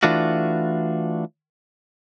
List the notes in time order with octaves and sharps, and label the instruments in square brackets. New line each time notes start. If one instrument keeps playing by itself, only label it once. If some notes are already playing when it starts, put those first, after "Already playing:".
[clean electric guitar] E3 A3 D4 F4 F#4